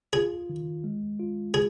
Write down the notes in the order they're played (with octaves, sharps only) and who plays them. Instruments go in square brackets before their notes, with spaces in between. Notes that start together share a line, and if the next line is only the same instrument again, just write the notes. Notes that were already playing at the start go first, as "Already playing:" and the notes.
[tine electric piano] F4 [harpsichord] G#4
[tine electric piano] D#3
G#3
F4
[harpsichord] G#4